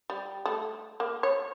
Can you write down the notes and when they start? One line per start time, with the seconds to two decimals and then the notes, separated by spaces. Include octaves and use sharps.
0.10 G3
0.45 A3
1.00 A#3
1.23 C#5